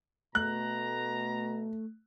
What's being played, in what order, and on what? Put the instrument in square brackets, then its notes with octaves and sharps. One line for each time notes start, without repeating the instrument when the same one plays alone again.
[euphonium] B2 [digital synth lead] A3 [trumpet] A#5 [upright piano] F#6